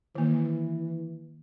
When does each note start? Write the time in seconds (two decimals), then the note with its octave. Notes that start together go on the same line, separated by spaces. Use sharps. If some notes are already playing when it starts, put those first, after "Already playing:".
0.15 D#3 E3 A#3